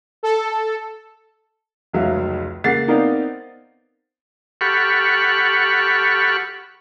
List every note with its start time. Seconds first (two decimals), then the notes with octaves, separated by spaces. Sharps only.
0.23 A4
1.93 F1 C#2 F#3 E5 F5
2.64 C#3 A#3 F#5 A6 C7
2.88 B3 C4 D#4 A#4 D5 F5
4.61 G4 A4 F#5 B5 C#6 F6